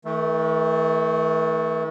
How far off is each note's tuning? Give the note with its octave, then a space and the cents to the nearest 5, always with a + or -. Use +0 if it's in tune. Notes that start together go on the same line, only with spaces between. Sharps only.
E3 -45 A3 +0